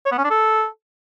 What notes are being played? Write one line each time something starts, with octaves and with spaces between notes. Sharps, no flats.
C#5
B3
C#4
D4
A4